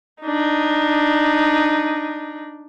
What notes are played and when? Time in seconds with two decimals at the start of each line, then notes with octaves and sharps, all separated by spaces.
0.22 D4 D#4